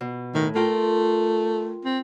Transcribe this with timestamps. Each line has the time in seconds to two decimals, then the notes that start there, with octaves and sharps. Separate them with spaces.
0.01 B2
0.35 A2 D#3
0.55 A3 F4 A#4 G5
1.85 C4